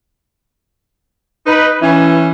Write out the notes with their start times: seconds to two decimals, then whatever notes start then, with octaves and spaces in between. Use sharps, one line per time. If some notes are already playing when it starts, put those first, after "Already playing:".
1.46 D#4 B4
1.82 E3 C#4